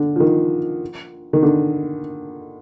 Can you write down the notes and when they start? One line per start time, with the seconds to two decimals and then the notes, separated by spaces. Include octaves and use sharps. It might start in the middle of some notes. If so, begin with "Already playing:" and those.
Already playing: D3
0.16 F3
0.20 D#3
1.33 D#3
1.43 D3